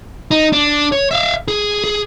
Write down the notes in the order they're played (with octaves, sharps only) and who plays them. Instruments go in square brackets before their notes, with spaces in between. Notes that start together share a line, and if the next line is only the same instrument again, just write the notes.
[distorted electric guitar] D#4
D4
C#5
E5 F5
G#4
G#4